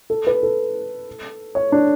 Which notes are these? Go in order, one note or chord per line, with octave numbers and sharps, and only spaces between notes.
A4
B4
A4
C#5
D4